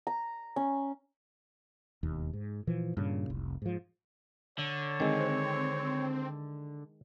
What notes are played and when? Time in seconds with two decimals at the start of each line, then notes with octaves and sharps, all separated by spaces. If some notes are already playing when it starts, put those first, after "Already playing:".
0.07 A#5
0.56 C#4
2.03 E1 D#2
2.33 G#2
2.67 A#2 E3 F3
2.97 G2 A#2 C#3
3.30 F1 C2
3.62 G#2 F3
4.58 D3 C#5
5.00 D#3 G#3 C4